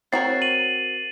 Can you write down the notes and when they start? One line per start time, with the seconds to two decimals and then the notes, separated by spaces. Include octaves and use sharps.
0.12 C4 F#4 A#4 C#5 A6 C7
0.42 D#7 F#7